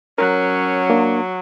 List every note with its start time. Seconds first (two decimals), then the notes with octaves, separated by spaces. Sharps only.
0.18 F#3 C#4 A#4 F#6
0.90 A#3 D4